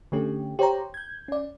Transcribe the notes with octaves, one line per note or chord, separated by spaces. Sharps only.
D3 A3 C#4 G4
G4 C5 C#5 G5 A#5
G6 G#6
C#4 D5